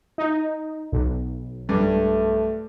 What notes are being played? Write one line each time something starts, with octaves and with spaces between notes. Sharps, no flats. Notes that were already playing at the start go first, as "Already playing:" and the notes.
D#4
B1
G2 A3